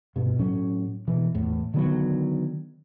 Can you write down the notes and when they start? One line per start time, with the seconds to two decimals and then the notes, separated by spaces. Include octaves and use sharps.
0.16 G2 B2
0.39 A2 F#3 C#4
1.07 B2 E3
1.35 E2 A2
1.74 D3 D#3 F#3 B3